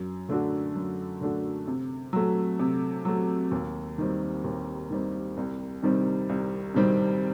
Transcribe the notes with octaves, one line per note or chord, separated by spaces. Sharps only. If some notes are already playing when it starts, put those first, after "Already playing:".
Already playing: F#2
D3 A3 D4 F#4
F#2
D3 A3 D4 F#4
C3
F#3 A3
C3
F#3 A3
D#2
D#3 G3 C4
D#2
D#3 G3 C4
C2
C3 D#3 G3 C4
C2
C3 D#3 G3 C4